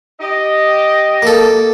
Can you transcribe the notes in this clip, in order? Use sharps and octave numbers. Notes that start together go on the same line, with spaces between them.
G4 D#5
A#3 A4